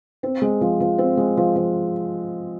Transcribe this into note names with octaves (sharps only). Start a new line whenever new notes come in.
C4
G#3
F3
F3
C4
G#3
F3
F3